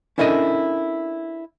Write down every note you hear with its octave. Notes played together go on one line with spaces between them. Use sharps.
C#4 D4 E4 A4 A#4 D#5